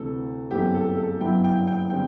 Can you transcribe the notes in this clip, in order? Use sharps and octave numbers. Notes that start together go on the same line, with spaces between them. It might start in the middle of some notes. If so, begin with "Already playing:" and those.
Already playing: D2 C3 E3 A3 A4
G1 F#2 E3 A3 C4 G4
A4
A4
G1 F#2 F#3 B3 E4 G5
G5
G5
D3 G3 C4 G5